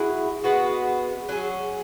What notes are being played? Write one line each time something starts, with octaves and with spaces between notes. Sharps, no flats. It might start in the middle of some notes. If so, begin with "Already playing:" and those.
Already playing: F#3 E4 G#4
G#3 B3 F#4
F#3 C#4 G#4